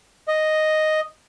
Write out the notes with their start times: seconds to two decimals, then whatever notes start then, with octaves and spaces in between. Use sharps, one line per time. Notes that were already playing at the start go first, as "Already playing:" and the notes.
0.28 D#5